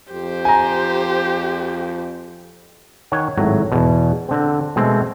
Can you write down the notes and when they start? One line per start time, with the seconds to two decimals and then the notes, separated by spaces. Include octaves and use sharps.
0.12 F2 G4 C5
0.45 G#5 A#5
3.12 D#3 C#5 F#5 G#5
3.38 G#1 A2 F#3
3.72 E2 B2
4.29 D3 C4
4.76 B2 G#3 A3 C4